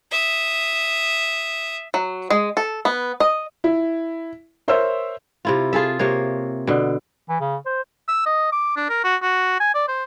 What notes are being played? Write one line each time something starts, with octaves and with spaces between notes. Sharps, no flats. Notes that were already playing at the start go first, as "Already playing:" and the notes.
E5 D#6
F#3
G#3
A4
B3
D#5
E4
A#4 C5 C#5 E5 E6
C3 E4 F4
F4 G#4 A4 E5
C3 A#3 C#5
B2 D3
E3
C#3
C5
E6
D#5
D6
D4
A#4
F#4
F#4
G#5
D5
C5